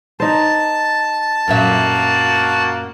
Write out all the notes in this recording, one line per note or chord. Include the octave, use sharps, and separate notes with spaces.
D#4 C5 A5
F#2 A#2 A#3 F#4 E5 F#5